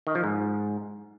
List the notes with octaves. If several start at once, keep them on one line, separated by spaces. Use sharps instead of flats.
D#3
F3
G#2